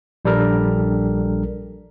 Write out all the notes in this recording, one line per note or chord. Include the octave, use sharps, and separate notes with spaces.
A#1 G3 D4 A4 A#4